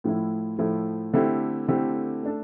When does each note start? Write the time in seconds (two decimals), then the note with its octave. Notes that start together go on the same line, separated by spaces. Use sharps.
0.04 A2 F3 A3 E4
0.59 A2 F3 A3 E4
1.14 D3 A3 C4 E4 G4
1.68 D3 A3 C4 E4 G4
2.23 A3 D4 A4